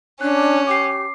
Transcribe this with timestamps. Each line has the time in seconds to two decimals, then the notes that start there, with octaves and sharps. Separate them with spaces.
0.21 C#4 D4 F#6
0.67 G4 D6 C7